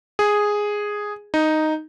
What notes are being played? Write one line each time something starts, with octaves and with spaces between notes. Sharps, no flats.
G#4
D#4